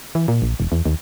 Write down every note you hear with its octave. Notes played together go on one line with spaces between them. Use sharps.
E3
A#2
A#1
E1
E2
D#2